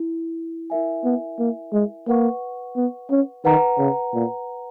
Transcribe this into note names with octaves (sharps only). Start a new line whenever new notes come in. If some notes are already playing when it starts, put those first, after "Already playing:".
Already playing: E4
E4 A#4 E5 G#5
B3
A#3
G#3
A#3 B4 F#5 C#6
B3
C#4
D#3 B4 F#5 A#5
C#3
A#2